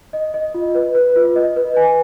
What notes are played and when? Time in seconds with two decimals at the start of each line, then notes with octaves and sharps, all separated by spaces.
0.13 D#5
0.34 D#5
0.55 F4
0.75 B4
0.95 B4
1.16 F4
1.36 D#5
1.56 B4
1.77 G#5